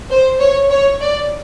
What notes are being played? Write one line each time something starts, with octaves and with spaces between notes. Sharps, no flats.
C5
C#5
C#5
D5